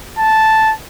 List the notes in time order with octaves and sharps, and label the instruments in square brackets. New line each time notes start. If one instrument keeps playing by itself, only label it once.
[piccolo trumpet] A5